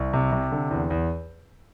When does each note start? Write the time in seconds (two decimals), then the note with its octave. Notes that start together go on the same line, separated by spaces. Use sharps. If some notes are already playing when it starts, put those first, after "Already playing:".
Already playing: C2
0.13 C3
0.32 C3
0.52 D3
0.71 E2
0.90 E2